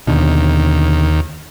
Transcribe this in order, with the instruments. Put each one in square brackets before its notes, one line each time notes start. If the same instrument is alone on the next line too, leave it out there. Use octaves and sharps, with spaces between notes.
[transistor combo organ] D#2 [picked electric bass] B2 D3